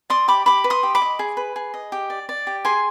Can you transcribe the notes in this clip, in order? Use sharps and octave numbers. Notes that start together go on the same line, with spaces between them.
D5 C6 D#6
G4 B5 D6
G4 B5 D6
B4
C6 D#6
G4
B5 D6
D#5
G#4
B4
G#4
D#5
G4
D5
D5
G4
G#4 G#5 C6